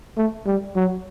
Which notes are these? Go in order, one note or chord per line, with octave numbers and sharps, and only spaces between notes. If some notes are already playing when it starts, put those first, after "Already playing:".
A3
G3
F#3